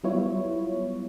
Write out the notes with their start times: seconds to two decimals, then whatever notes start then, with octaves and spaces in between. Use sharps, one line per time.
0.03 F#3 G3 B3 E4 F4 C#5